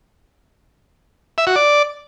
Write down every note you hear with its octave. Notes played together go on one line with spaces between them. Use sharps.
E5
F#4
D5